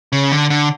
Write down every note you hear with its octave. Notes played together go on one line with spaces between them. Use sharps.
C#3
D3
D3